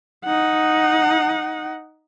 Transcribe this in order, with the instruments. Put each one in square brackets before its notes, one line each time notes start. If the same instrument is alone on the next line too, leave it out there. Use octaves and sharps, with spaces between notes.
[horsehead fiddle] D#4 F#5